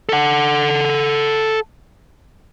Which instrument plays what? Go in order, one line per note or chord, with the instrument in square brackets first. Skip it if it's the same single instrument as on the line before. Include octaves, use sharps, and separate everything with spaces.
[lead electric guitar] A4 F#5